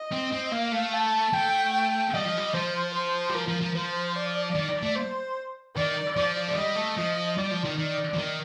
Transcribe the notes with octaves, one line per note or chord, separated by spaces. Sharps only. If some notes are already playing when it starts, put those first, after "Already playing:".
Already playing: D#5
C4
C4
A#3 F5
A3
A5
A3 G5
G5
G3 D#5
F3
G3
F3 C5
C5
G3
F3 A#4
F3
F3
F3 C5
D5
D#3
A3
C5
D#3 D5
F3 D5
A3
G3 D#5
A3
F3 D#5
G3 D5
F3
D#3
D#3 D5
F3
D#3